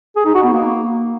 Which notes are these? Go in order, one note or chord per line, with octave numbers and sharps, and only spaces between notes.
G#4
D#4
F#4
B3
A#3